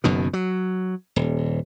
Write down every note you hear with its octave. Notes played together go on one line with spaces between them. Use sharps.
F#1 F#2 B2 D#3
F#3
D#1